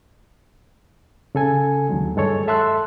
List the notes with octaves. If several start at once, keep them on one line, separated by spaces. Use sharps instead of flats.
C#3 A4 G#5
D#2 D3 F#3 G#3
G2 G#3 A4 C#5
A4 E5 A5 C6 E6 F#6